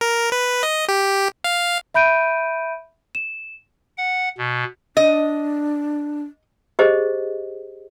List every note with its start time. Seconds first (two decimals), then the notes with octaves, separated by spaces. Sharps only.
0.01 A#4
0.32 B4
0.63 D#5
0.88 G4
1.44 F5
1.94 E5 B5 G6 D7 D#7
3.15 E7
3.97 F#5
4.38 B2
4.97 D4 D#5
6.79 G4 G#4 C5 D#5